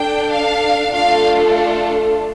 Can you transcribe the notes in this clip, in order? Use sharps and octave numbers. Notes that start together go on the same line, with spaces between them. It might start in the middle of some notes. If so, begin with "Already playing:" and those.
Already playing: D4 A4 G5
F5
A3 D4 F4 A4 F5